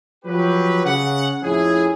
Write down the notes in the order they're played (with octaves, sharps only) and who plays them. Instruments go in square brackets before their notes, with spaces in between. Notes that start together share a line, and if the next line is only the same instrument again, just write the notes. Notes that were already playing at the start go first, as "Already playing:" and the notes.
[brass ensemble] F3 F#3 G4 B4
C#3 F#5
F2 A2 C#4 E4 G#4